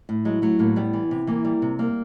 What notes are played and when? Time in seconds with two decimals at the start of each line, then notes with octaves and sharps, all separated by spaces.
0.09 A2
0.25 F#3 G#3
0.42 F#3 A3
0.59 A2 A#3
0.76 G3 B3
0.93 E3
1.11 C3
1.27 E3 A#3
1.45 G3
1.62 C3
1.79 G3 A#3